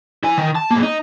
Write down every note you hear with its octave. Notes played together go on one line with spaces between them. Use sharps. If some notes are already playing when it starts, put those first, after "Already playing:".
E4 G#5
D#3
A5
G#2 A#3
D#4